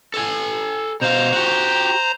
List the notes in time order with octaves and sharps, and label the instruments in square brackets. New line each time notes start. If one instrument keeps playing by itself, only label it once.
[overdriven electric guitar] A4 G#5
[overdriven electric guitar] B2 F5 [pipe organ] C5 A#5
[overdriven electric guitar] F#4 G4